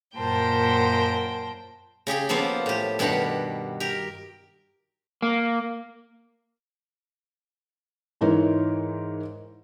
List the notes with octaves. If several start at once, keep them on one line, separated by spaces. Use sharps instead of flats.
F#2 A#2 A#4 C5 G5 A5
C#3 G4 G#4 G5
F3 A#3 B3 F4 A4 C5
A2 G4
G2 B2 D#3 G4 F#5 B5
G4 A#4
A#3
G#2 E3 D#4 A#4 C#5